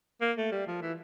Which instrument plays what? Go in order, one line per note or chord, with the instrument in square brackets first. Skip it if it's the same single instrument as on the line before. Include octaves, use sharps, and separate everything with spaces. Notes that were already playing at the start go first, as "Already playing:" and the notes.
[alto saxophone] A#3
A3
G3
F3
E3